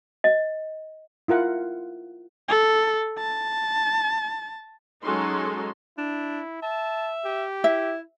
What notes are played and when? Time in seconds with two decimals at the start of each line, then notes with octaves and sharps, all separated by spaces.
0.24 D#5
1.28 E4 F4 A#4 F#5
2.49 A4
3.18 A5
5.03 F#3 G#3 C#4 D#4 A4 C6
5.98 D4 E4
6.62 E5 A5
7.25 G4
7.64 E4 E5